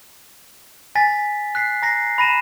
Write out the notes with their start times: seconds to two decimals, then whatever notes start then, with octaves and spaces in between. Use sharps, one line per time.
0.95 G#5 A6 B6
1.55 F#6 B6 C7
1.82 A#5 A#6 C7
2.18 B5 A#6 D#7 E7